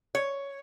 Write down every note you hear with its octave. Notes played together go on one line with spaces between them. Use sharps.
C#5